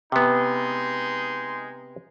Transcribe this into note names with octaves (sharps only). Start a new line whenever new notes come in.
C3 G#3 B3 D#4 C6